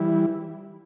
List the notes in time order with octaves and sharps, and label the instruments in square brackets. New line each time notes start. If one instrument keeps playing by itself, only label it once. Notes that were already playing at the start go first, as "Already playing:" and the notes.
Already playing: [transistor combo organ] E3 G3 E4